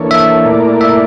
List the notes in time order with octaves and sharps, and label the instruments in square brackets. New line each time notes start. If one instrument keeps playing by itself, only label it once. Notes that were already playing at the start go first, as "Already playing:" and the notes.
Already playing: [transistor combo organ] E3 A#3 D4 A4 C#5
[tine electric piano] E5
[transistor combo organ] A#2 A3 E4 A#4 D5
[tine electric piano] E5